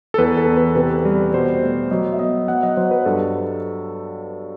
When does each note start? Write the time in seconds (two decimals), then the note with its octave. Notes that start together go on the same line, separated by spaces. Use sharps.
0.14 A4
0.18 E2 B4
0.37 A4
0.48 E2
0.57 B4
0.75 C3 B4
1.05 G3
1.34 B2 C5
1.63 A3
1.91 F#3 D#5
2.13 E5
2.19 B3 D#5
2.48 F#3 F#5
2.63 D#5
2.77 F#3 C5
2.91 B4
3.05 G2 A4